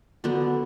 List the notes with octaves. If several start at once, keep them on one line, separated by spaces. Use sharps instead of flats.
D3 F#3 B3 D4